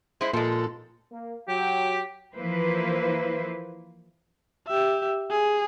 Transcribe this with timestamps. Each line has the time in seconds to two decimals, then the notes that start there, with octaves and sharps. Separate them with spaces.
0.21 G#3 E4 C5
0.33 A#2 F3 G#3 A4
1.12 A#3
1.48 F#3 G4 G5
2.35 E3 F3 A#3 E4 B4 C5
4.67 G4 E5
5.31 G#4